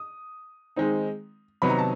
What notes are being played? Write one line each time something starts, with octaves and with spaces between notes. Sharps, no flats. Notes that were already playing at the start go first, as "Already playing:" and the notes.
Already playing: D#6
D#3 G#3 C4 D#4
C3 D#3 F#3 B3 D#4 B5
A#5
A5